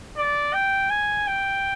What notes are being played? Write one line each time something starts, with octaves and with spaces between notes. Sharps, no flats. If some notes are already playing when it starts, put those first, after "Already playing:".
D5
G5
G#5
G5